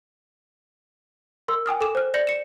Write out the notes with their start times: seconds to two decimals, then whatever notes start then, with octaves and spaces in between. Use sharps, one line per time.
1.48 A#4 C6 E6
1.66 G5 G#5 D#6 F6
1.81 A4 D6 E7
1.95 C5 F6
2.14 D5 G6 A#6 C#7 F#7
2.27 C#7 E7